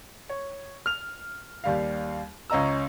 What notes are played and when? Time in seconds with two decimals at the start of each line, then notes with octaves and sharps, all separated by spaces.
0.29 C#5
0.86 F6 F7
1.64 D#2 G3 F5
2.50 C#2 C#4 D#5 A#5 E6